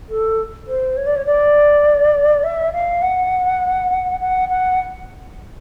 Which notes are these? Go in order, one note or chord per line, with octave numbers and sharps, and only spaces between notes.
A4
C5
C#5
D5
C#5
D5
E5
F5
F#5
F#5
F#5